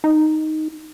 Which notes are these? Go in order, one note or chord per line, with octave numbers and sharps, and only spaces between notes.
D#4